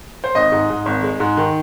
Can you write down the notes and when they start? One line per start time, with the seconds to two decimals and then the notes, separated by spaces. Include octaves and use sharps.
0.24 C5
0.35 G#1 D#5
0.52 G#2
0.70 G#2
0.86 G#1
1.03 G#3
1.20 G#2
1.37 D#3